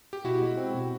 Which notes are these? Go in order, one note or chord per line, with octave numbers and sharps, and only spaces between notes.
G4
B2 E4 F#4
G#3
C4
B2